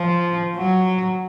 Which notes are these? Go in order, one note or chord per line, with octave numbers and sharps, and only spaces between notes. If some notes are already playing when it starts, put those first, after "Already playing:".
Already playing: F3
F#3